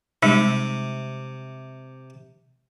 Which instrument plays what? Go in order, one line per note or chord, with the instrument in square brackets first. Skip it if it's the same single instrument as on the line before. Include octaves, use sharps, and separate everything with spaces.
[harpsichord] C3 [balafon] G3 G#3 D#4